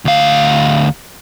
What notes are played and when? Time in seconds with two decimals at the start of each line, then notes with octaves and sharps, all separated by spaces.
0.05 D2 F5